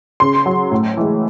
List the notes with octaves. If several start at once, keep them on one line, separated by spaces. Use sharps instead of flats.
C#3 C6
F#3
A2
E3 G#3